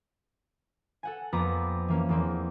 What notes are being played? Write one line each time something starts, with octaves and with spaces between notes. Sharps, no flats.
A4 F#5 G#5
F2 A#3 B3 B4 A#5 D6
E3 A#3 C#4
E2 A#3 C4